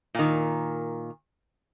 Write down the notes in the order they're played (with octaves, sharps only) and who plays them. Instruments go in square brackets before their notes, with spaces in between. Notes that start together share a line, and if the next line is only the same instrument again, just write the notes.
[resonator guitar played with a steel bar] A#2 D#3